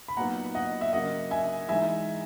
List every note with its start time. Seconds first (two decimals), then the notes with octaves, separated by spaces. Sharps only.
0.08 B5
0.17 A#2 F#3 B3 D#4 F#5 A#5
0.55 D#5 F#5
0.81 E5
0.93 C#3 F#3 A#3 D#5 F#5
1.31 E5 G#5
1.68 E3 G#3 D#4 E5 G#5